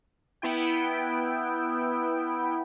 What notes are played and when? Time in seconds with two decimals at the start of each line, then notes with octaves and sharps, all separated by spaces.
0.42 B3 E4 G5